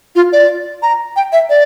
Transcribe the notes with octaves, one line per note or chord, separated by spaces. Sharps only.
F4
D5
A#5
G5
E5
D5